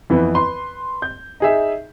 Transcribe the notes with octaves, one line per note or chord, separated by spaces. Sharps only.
F2 E3 B3
B4 C6
G6
D#4 G#4 E5